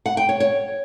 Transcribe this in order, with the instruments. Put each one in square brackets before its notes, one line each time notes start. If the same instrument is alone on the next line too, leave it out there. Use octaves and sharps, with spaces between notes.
[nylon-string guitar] F#5
G5
C#5
C#5